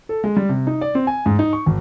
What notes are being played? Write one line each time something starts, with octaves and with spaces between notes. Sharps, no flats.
A4
G#3
G3
C3
D#4
D5
C4
G#5
G#2
D#4
C#6
G#1